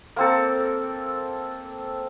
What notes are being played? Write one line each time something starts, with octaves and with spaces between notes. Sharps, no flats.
A#3 C4 A4